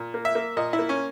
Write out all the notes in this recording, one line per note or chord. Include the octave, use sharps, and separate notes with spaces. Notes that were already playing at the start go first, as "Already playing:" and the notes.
Already playing: A#2
A#3
E5
A#3
A#2 D#5
E4
A#3
C#4